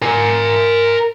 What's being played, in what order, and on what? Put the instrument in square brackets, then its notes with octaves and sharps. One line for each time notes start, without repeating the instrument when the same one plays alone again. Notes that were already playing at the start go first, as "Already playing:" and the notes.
[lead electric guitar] A#4 G#5